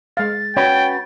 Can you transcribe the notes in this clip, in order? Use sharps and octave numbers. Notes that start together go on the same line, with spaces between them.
G#3 F5 A6
C#4 F#4 B4 C#5 G5